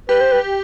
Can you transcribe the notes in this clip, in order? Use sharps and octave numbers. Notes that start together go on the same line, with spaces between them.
G4 B4
C5
B4